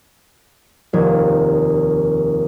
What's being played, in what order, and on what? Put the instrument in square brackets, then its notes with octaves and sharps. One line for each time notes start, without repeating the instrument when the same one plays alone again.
[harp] F1 D#2 G#6